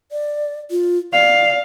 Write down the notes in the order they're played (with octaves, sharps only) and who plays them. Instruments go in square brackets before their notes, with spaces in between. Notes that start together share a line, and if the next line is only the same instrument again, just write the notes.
[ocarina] D5
F4
[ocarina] D5 [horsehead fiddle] F5